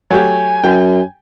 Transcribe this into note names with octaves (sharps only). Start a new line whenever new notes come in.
F#3 A3 G4 G#5
F#2 G5